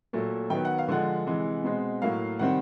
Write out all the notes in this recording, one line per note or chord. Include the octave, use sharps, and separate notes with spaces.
A#2 F#3 A3
D#3 F#3 B3 G5
F#5
F5
D3 F3 G#3 F#5
C3 E3 G#3
B2 G#3 C4
A2 F#3 A#3 F5
C3 D#3 G3 C4 F#5